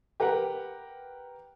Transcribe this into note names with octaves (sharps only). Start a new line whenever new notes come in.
G4 A#4 B4 F#5